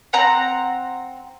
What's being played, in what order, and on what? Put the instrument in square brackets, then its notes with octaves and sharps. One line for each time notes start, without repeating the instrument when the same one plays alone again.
[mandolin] C4 F#5 A#5